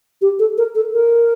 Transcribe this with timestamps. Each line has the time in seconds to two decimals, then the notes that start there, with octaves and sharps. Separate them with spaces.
0.22 G4
0.39 A4
0.58 A#4
0.75 A4
0.92 A#4